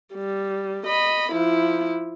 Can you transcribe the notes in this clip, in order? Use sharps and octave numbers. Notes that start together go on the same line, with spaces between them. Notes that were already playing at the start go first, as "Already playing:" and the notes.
G3
D#5 B5
F3 E4